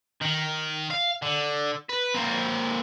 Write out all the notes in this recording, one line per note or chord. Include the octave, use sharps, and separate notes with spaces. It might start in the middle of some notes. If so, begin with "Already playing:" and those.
D#3
F5
D3
B4
A#3 C4